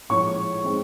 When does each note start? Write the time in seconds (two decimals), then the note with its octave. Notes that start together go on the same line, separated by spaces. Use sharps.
0.09 A#1 A2 F3 G#3 C#5 C#6
0.64 D#3 G#3 C4